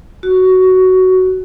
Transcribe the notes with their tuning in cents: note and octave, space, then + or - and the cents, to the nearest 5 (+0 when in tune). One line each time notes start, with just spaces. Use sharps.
F#4 +10